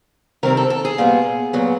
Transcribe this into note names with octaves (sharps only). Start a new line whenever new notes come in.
C3 D#3 G3 C4 A#4
A4
A4
G#4
A#2 G3 B3
A#2 F#3 B3